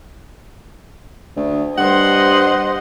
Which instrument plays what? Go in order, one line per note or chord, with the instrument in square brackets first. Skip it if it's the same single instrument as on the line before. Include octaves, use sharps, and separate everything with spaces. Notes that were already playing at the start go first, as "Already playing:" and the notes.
[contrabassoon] D2
[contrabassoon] G2 [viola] C5 D#5 [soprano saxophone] F#5